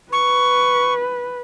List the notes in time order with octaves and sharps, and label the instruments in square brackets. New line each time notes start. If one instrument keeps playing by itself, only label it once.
[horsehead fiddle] B4 [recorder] C#6